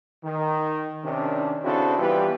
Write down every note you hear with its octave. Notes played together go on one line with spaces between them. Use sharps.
D#3
C3 D#3 C#4 D4
C#3 C4 D4 E4 F#4 A4
E3 G3 B3 F4 G4 B4